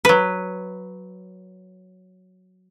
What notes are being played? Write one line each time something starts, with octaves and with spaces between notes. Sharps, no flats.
F#3 B4